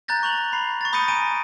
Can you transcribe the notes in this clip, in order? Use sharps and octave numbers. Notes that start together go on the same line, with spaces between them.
A#5 F#6 G6 A6 A#6
C#6 F7 F#7
B5 C7
C#6 A6
B5 D#6 G6 A#6 C#7 D#7
G#5 A#5 D7 D#7